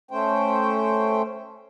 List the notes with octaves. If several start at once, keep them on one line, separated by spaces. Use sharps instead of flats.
A3 C#4 C5 G5